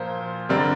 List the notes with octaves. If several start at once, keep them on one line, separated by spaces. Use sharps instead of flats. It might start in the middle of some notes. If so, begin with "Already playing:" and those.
Already playing: A#2 F3 A#3 F4 C5
D3 G3 C4 A#4 D5